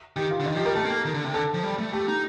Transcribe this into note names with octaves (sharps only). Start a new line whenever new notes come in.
D#3 G4
F4
D3
D#3 D#4
F3 G4
G3 A#4
A3 A4
C4
A#3
D#3
D3
C3
D3 A4
F3
G3
A3
A3 G4
D#4